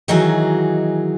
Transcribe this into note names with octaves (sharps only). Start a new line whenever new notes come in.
D#3 E3 F#3 D#4 F#4 G#4